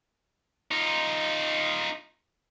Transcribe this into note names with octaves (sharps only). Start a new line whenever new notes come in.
D#4 F4